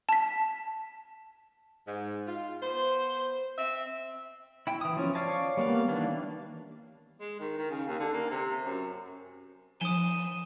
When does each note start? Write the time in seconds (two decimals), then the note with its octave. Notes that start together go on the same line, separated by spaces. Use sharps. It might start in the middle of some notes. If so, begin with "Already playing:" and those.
0.09 A5 B6
1.86 G#2
2.27 F4
2.62 B3 C5
3.58 C4 E5
4.67 E4 G5
4.81 E3 D#6
4.97 F3 C#4
5.15 C#5 D5 F5 G#5 A5
5.57 G3 A#3 B3 F5
5.88 D#3 E3 G3 A#3 D4
7.20 G#3
7.40 D#3
7.58 D#3
7.70 C#3
7.87 D#2
7.99 D3
8.13 A#3
8.30 C3
8.64 F#2
9.81 F3 G#5 D#6 D#7 E7 G7